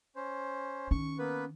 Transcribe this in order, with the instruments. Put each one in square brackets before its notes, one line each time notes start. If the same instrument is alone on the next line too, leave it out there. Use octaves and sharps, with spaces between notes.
[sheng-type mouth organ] C#4 C5
[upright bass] D#3 C#4 [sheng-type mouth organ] C#6
[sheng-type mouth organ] A#3 B3 B4